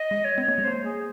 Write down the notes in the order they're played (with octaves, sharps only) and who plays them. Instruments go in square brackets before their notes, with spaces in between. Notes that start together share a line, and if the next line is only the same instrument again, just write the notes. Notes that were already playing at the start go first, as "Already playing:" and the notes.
Already playing: [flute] D#5
[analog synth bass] G#3
[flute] C#5
[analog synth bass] C4
A#3
G#3
[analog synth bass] A#3 [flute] C5
[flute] G#4